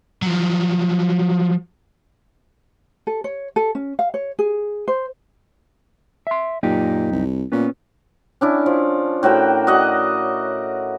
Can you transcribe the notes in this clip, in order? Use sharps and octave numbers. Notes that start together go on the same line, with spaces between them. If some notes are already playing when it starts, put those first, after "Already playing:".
F3 F#3
A4
C#5
A4
C#4
F5
C#5
G#4
C5
E5 C6
F#2 A#2 D#4 G4
C2
A#2 B3 C#4
C#4 D4 E4
F3
A2 F#4 A#4 G5
F#4 D5 D#5 F#5